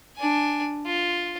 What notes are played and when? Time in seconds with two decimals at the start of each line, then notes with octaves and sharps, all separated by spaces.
0.17 D4 G#5
0.86 F4